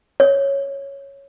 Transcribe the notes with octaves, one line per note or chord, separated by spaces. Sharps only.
C#5